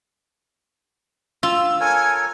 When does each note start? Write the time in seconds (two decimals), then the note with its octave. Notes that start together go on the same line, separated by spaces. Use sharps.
1.43 F4 E6
1.80 A4 A#4 C#5 G#5